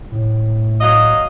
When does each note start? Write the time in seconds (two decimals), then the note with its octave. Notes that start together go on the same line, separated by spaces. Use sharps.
0.12 A2
0.81 F#3 D#5 F5